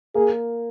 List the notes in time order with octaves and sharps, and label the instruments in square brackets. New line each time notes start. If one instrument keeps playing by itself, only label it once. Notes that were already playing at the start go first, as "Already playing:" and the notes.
[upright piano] A#3 [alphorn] G#4